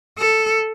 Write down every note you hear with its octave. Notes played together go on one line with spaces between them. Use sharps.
A4